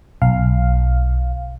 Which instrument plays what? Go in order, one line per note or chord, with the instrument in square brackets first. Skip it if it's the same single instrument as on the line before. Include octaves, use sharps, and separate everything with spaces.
[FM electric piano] B1 F5